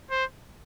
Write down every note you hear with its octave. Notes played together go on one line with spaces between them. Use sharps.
C5